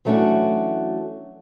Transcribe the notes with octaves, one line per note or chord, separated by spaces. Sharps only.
E3 F#3 A3 C#4 D4 F#4